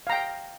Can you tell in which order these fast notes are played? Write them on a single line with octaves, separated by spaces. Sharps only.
F5 A#5 G5